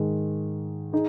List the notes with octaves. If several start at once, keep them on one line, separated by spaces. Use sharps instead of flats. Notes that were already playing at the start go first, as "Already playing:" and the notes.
Already playing: G#2 D#3 G#3
D#4 G#4